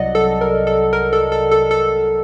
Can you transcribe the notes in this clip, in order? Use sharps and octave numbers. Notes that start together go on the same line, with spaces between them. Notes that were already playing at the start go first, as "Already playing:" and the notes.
Already playing: C2 C3 F#3 D5 D#5 F#5
A4
A#4
A4
A#4
A4
A4
A4
A4